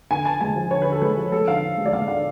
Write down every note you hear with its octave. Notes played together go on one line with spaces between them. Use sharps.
D3 G#5
D3 A5
G#3 G#5
F3
D3 C#5
D3 B4
A4
G#3 B4
F3
G#3 A4
D3 F5
D3
G#3
D5
G#3 F5
D3 F5